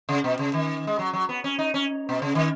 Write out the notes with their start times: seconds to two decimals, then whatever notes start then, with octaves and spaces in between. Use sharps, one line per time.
0.09 C#3
0.24 B2
0.39 C#3
0.54 D#3
0.87 G#3
0.99 F#3
1.13 F#3
1.29 B3
1.44 C#4
1.59 D#4
1.74 C#4
2.09 B2
2.22 C#3
2.35 D#3